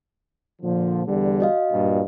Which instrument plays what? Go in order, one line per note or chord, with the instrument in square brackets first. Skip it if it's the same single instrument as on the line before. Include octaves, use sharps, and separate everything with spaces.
[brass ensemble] A#2 D3 F3
E2 D3 G3
[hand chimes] F#4 D#5 F5
[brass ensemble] G2 A#2